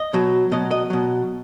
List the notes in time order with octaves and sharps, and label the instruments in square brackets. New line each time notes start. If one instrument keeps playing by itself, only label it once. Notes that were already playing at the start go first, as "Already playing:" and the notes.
Already playing: [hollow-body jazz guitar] D#5
B2 F#3
B2 F#3 D#5
D#5
B2 F#3